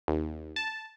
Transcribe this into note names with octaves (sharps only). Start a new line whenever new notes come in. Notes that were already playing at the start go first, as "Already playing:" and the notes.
D#2
A5